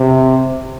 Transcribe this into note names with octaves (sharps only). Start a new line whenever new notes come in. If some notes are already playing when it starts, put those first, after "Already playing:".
Already playing: C3